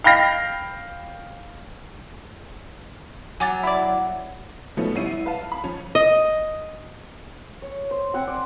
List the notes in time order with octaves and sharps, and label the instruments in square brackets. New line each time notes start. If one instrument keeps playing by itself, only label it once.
[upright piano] F5 G5 B5 F6 A#6 C7
[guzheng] F#3 [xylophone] G#5 D6 A6
[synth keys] E4 D5
[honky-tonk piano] B2 F3 A3 B3 C#4 D#4
A1 G3 C#4 E4 C7 D#7
E4
B4 F5 A5
B5
F3 C#4 C#5
[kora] D#5
[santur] C#5
C5
C4 F#5 G#5 C6
D5